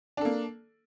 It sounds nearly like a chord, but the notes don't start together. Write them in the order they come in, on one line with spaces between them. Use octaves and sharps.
D4 A4 A#3